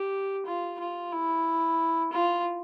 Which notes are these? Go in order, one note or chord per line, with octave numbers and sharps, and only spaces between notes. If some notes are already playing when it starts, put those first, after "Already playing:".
Already playing: G4
F4
F4
E4
F4